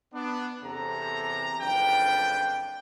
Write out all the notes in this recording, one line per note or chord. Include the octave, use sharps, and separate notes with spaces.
B3 D4
E2 C3 A4 C5 A#5
F#1 F2 D4 F4 B4 G5